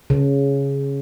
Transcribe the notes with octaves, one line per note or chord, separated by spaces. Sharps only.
C#3